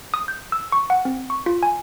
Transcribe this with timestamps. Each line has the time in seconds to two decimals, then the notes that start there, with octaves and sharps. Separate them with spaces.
0.14 D#6
0.28 G6
0.52 E6
0.72 C#6
0.90 F#5
1.05 C4
1.30 C#6
1.46 F4
1.63 G#5